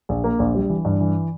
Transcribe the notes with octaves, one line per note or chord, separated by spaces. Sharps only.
A#1
A#3
A#1
G3
E3
G2
E3